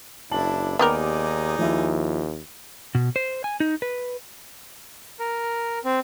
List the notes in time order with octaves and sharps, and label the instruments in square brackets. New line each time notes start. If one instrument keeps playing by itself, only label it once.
[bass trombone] F#1 [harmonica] D4 E4 [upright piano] A5 F#7
[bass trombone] D#2 [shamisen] B3 G4 A#4 [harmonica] D#4 G#4 D5 [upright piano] D6
[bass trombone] D#2 [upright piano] F3 E4
[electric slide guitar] B2
C5
G#5
D#4
B4
[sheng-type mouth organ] A#4
C4